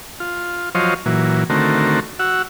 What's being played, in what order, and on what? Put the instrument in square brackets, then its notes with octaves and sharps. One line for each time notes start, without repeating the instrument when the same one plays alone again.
[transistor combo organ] F4
F3 F#3 F4 C5 C#5 D#5
A#2 E3 F#3
D3 D#3 A3 C4 F#4 A#4
F#4 F#5 E6